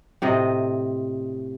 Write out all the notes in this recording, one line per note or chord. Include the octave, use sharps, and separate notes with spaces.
A2 C3 D#5